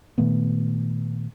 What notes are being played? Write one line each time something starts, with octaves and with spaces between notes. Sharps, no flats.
A#2 D#3 A3 B3